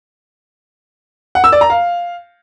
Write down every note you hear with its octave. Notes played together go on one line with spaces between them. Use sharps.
F#5
E6
D5
A#5
F5